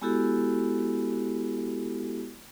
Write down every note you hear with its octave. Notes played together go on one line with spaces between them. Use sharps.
G#3 B3 E4 F#4 G4 A4